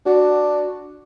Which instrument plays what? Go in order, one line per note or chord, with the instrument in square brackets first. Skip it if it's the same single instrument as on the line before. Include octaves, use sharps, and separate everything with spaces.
[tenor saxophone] D4 [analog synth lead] F#4